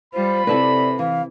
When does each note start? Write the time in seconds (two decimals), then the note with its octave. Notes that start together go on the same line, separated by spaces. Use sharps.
0.14 G3 F4 C5 B5
0.47 C3 E4 A4 B4 D5
0.99 E3 F5